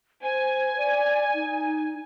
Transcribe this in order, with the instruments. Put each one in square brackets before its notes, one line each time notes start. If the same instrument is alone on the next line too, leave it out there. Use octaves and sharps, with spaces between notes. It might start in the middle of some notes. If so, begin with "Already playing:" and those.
[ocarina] C5 [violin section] G#5
[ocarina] D5
D#4